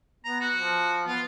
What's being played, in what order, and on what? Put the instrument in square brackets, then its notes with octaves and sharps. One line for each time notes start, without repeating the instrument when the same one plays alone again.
[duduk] B3 [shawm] A#5
[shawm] F#4
[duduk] F3
[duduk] B3 [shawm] F4